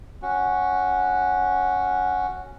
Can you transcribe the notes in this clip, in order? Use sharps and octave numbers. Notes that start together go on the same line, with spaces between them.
C#4 F#4